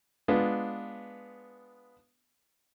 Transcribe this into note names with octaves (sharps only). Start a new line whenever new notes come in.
G#3 B3 D4 F4